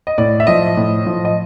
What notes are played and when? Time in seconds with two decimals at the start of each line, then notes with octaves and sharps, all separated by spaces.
0.07 D#5
0.18 A2 D5
0.40 E5
0.47 F3 D#5
0.77 A2
1.06 F3
1.25 D#5